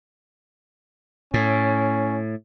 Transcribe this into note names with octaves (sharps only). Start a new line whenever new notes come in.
A2 C#4